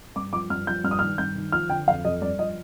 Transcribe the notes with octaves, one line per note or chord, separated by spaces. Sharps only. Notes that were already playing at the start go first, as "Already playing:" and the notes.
G2 D6
F3 D6
G2 F6
F3 G6
G2 F6
D#6
F6
D#3
G2 G6
D#3
F3 F6
D3 G5
F2 F5
F2 D#5
G2 D5
F3 D#5